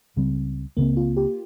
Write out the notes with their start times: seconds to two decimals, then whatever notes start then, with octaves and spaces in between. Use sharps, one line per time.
0.16 C#2 C#3 G3 C4
0.77 C#2 C#3 G3 A#3 C4
0.97 F4
1.17 G4